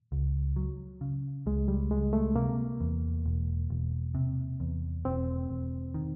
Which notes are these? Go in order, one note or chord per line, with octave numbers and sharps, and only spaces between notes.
C#2
F#3
C#3
C#2 G#3
G3
C#2 G#3
A3
C3 A#3
E2
E1
E1
C3
E2
E1 C4
E1
D#3